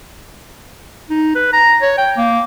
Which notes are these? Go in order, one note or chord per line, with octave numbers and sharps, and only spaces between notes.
D#4
B4
A#5
C#5
G5
A#3